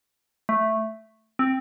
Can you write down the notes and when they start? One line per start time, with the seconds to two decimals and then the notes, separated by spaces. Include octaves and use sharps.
0.49 A3
1.39 C4